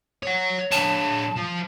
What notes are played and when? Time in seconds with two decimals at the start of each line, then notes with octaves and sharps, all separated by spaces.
0.23 C#5 F#5
0.72 D3 C#5 A5
1.37 F3